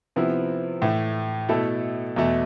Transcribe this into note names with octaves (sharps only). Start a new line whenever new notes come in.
C3 F3 B3 E4
A2 E3 A3
B2 A3 E4 A4
E2 B2 A3